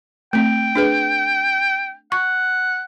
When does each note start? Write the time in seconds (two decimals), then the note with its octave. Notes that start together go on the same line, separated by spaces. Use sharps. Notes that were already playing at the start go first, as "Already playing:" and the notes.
0.33 A3 C4 G5
0.75 D4 G#4 B4
2.12 F#5 C#6